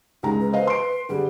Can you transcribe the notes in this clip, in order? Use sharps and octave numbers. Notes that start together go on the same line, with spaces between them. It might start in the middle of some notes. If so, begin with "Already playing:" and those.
C#2 G#3 D#4 A#5
B4
B4 C5 D#5 F5
C6 D7
D3 G3 G#4